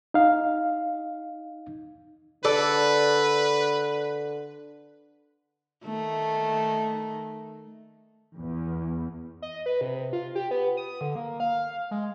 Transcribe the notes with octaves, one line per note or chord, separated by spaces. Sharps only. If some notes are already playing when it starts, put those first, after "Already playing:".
D#4 F5
D3 A4 B4 D5
D#3 A3
E2
D#5
B4
C3
F4
G4
B3
D#6
D3
A#3
F5
G#3